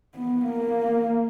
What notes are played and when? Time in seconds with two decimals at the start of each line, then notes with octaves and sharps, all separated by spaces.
0.15 B3
0.45 A#3